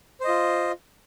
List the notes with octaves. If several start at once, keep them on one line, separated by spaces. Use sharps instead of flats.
F4 C5 D#5